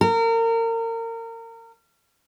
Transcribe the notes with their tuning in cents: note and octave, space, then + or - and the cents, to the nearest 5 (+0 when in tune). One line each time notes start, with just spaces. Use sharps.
A#4 -30